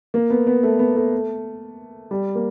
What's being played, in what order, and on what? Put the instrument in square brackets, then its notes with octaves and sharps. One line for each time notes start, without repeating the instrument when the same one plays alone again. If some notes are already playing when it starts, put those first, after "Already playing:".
[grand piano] A#3
B3
B3
A3
B3
A3
G3
A#3